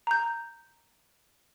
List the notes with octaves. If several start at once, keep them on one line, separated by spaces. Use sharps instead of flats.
A#5 G6